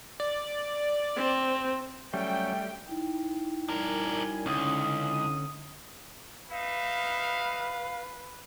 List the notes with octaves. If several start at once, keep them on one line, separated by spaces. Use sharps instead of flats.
D5
C4
F#3 G3 A3 C#4 G5
D#4 E4 G5
F#2 G3 D4 A#4 G#5
C#2 D3 C#4 D#6
D#4 B4 E5 F5